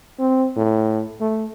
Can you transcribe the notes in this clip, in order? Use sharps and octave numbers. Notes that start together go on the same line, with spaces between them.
C4
A2
A3